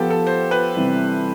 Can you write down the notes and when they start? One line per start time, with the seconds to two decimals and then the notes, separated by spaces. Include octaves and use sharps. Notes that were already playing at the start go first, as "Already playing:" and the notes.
Already playing: F3 B3 F4 G4 A4
0.10 A4
0.27 C5
0.51 B4
0.76 C3 E3 G3